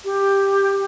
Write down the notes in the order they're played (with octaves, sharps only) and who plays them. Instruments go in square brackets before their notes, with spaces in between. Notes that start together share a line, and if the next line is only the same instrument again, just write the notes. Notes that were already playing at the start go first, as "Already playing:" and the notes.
[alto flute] G4